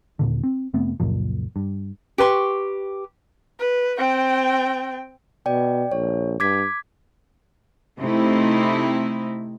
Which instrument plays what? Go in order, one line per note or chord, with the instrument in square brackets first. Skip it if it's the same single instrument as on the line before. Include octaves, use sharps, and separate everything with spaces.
[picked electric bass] D#1 A#2 D3
C4
F1 A3 B3 C4
C#2 F#2 A#2 F3
G2
[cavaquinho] G4 B4 C6 C#6
[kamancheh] B4
C4 G5
[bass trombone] B2 [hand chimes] D5 G5
[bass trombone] A#1 [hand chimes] C#5
[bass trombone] G2 [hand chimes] D6 G#6 B6
[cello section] C3 A3 C4 D#4 E4